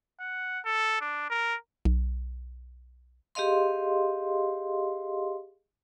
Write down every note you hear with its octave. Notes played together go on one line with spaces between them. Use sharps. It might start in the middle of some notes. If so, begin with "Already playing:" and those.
F#5
A4
D4
A#4
B1
G4 G#4 D#5 F5 C6